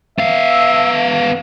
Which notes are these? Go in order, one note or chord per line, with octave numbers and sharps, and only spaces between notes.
B3 E5 F5